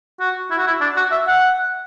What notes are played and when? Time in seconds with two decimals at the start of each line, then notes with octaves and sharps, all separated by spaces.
0.20 F#4
0.51 E4
0.58 F#4
0.67 E4
0.81 D4
0.96 F#4
1.11 E5
1.27 F#5